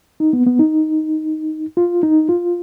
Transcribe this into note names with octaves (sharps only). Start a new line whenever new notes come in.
D#4
B3
B3
D#4
F4
D#4
F4